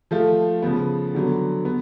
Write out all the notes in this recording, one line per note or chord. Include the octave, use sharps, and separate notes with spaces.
F3 A3 F4
C#3 F3 B3
D3 F#3 B3
B3